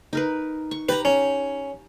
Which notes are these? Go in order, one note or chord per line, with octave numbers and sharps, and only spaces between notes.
D#4 A#4 B4
C#6
G4 B4 A#5
C#4